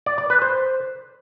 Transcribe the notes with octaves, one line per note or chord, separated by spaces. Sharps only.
D5
D5
B4
C5